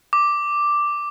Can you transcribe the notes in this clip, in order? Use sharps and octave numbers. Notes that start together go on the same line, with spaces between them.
D6